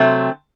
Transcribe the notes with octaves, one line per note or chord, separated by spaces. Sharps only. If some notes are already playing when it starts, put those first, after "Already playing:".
Already playing: C3 F#3 A3 C4